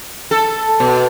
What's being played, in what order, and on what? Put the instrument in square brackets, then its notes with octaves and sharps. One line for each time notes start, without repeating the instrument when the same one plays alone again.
[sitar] A4
B2